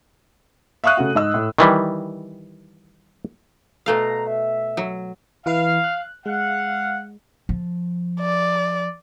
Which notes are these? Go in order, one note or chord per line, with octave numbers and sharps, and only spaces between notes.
E5 F5 C#6 D#6 F#6 D#7
C#3 A3 F#4
G#2 D#5 E6
A2
D#3 E3 G3
B2 A3 F5 A#5
E5
F#3
E3 E4 B4 F5
F#6
G#3 F5 F#5
F3
D5